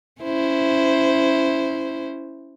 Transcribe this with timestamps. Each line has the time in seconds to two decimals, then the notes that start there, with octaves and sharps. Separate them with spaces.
0.22 C#4 E4 C5